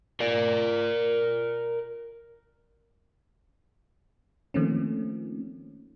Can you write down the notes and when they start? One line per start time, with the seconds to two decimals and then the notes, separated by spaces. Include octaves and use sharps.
0.20 A#4 D5
4.54 D#3 F3 A3 A#3 C4 C#4